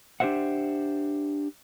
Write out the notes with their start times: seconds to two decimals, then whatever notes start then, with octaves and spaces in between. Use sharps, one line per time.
0.20 D4 G4 G#4 C5 E5 F#5